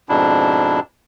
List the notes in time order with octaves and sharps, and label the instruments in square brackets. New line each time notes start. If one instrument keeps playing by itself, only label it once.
[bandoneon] F2 G#2 B2 D4 E4